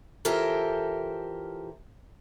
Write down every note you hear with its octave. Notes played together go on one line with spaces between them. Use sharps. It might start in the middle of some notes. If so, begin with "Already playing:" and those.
E3 F4 G4 A4 A#4 C5